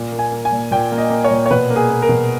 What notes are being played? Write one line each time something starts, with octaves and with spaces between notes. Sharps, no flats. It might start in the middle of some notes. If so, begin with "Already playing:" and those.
Already playing: A#2
A#3
G#5
A#3
G#5
A#2
A#2 G5
A#3
D#5
A#3
C#5
A#2
C#5
B2 B4
A#3
G#4
A#3
A#4
B2